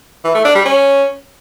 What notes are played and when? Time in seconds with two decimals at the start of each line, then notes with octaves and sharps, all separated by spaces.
0.25 E3
0.35 A3
0.45 D4
0.55 G3
0.65 C#4